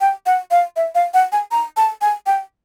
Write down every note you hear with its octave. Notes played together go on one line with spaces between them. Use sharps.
G5
F#5
F5
E5
F5
F#5
G#5
A#5
A5
G#5
G5